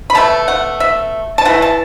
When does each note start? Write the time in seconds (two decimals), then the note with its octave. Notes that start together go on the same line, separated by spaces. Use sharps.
0.10 B5
0.15 B2 A3 A5
0.48 F#5
0.80 E5
1.38 A5
1.45 E3 F#5
1.50 A3
1.62 A5